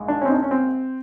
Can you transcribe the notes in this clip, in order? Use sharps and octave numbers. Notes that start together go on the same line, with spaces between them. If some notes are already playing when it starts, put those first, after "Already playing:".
Already playing: A#1 G#2
D4
C#4
C4
D#4
D4
C#4
C4